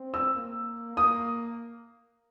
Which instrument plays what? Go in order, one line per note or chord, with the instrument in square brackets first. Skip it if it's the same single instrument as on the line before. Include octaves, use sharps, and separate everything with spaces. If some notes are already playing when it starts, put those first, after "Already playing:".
Already playing: [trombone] C4
[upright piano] E6
[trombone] A#3
[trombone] A#3 [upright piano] D#6